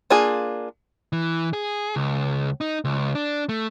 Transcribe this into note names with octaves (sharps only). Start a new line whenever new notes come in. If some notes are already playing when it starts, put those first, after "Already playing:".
A#3 D4 F4 G#4
E3
G#4
C#2
D#4
C#2
D4
A3